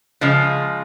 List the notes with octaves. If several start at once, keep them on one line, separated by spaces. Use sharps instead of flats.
C#3 F3 G#3